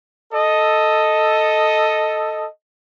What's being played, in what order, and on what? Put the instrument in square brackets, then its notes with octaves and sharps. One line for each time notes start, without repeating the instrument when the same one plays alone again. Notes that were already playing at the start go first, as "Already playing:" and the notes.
[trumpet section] A4 D#5